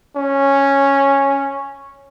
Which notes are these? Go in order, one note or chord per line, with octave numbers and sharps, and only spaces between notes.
C#4